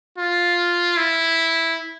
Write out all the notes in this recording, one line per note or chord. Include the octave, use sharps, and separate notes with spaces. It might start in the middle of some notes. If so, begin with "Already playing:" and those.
F4
E4